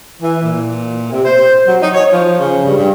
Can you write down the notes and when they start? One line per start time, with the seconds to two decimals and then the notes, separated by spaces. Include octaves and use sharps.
0.22 E3
0.43 A#2
1.12 C3
1.25 C5
1.67 F#3
1.82 D#4
1.94 C#5
2.12 F3
2.38 C#3
2.64 G2
2.77 G2